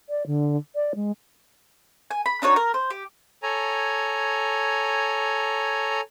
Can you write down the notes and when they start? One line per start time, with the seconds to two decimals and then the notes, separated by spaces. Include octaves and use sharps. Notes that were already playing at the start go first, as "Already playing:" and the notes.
0.09 D5
0.27 D3
0.75 D5
0.95 G#3
2.11 G#5
2.26 B5
2.42 D4 D#4 F#4 C#5
2.56 A#4
2.74 C5
2.90 G4
3.43 A4 C#5 G#5 A#5